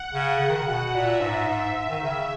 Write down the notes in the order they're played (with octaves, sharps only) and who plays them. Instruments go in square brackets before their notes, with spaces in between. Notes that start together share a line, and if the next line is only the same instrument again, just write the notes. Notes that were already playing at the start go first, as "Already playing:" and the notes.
Already playing: [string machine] F#5
[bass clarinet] C#3
C#3
D#3
C#3
B2
[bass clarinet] A#2 [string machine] E5
[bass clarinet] G#2
G#2
G#2
D#3
C#3